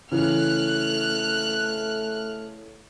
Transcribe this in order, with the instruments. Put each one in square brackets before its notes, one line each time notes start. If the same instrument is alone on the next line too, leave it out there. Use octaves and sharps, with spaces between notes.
[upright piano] C#3 E3 [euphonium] A3 [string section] F6 F#6